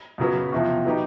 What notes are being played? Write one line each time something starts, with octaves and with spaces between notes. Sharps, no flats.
F#2 C#3 F#3 B3
E2 C3 F3
F#3 B3 D#4 G4